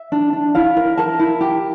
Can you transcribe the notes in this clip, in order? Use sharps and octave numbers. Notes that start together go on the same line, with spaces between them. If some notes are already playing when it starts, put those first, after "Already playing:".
Already playing: E5
D4
D4
E4 F5
A#4
A#4 A5
E4
G4